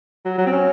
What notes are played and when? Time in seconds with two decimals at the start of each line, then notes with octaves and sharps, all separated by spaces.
0.25 F#3
0.38 F#3
0.47 C4
0.52 C#4